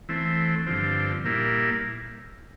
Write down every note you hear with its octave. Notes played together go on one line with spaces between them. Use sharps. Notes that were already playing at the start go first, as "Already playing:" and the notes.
E3 A3 C4
G2 D3 F3 C4
A#2 G3 A#3 E4